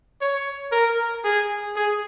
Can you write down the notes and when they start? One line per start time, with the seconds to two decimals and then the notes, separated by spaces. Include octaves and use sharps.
0.21 C#5
0.72 A#4
1.25 G#4
1.76 G#4